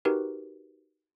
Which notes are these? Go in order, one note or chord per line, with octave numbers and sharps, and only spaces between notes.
D#4 F#4 G4 A#4 B4